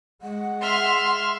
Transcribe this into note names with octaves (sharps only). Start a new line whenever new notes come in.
G#3 F#5
E5 C6 F6